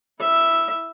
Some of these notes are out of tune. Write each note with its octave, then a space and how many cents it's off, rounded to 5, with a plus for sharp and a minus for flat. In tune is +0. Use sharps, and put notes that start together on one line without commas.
E4 -5 E5 +0